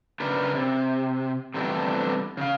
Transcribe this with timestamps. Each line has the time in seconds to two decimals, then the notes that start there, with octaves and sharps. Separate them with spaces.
0.20 C#3 D4 A#4 B4
0.54 C3
1.54 C3 E3 G3 A3 B3 D4
2.37 C#3 F5